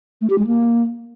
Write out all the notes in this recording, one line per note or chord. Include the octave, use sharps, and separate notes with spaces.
A3
G4
G#3
A#3